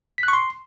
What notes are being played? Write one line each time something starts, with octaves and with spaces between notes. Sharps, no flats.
B6
F#6
C#6
C6